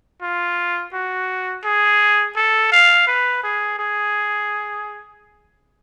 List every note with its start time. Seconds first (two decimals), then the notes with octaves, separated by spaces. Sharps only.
0.22 F4
0.93 F#4
1.65 G#4
2.36 A4
2.72 F5
3.07 B4
3.44 G#4
3.79 G#4